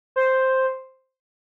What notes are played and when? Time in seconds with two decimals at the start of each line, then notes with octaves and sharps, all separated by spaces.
0.16 C5